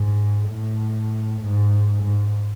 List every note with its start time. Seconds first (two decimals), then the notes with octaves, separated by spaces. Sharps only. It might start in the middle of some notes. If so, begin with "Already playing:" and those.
Already playing: G#2
0.49 A2
1.41 G#2
2.03 G#2